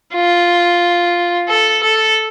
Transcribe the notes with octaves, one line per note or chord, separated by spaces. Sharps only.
F4
A4
A4